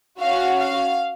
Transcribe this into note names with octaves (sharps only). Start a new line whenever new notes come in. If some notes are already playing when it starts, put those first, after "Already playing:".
C#4 F#4 F5
F5